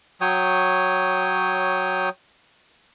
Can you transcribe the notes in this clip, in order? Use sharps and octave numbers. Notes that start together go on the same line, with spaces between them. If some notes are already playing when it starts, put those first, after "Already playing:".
F#3 C#5 G5 D#6